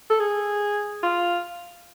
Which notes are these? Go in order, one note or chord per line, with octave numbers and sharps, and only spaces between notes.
A4
G#4
F4